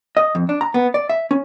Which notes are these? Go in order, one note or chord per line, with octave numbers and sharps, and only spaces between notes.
D#5
F2
D4
A#5
B3
D5
E5
C#4